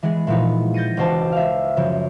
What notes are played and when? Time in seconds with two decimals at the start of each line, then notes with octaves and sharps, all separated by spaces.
0.03 E3 G#3 B3 G#4
0.27 A#2 E3 F3 B3 D#4
0.74 G6 A6 A#6 C#7 D#7
0.97 E1 C#2 F#4 C5 G5 A5
1.32 E5 F5
1.77 F#2 C#3 F3